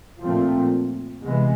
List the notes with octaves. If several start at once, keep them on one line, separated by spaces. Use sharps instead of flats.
A#2 F3 A3 C4
C3 E3 G#3 B3